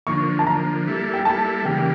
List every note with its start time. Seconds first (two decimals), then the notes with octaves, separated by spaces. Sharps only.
0.07 D3 F3 A#3 C#6
0.39 A5
0.47 D3 F3 A#3 A#5
0.86 G3 A#3 E4 A4
1.13 G5
1.25 G3 A#3 E4 A4 A5
1.65 C#3 E3 G3 A#3 G5
1.78 G5